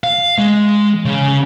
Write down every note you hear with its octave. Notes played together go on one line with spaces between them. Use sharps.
F5
G#3
C#3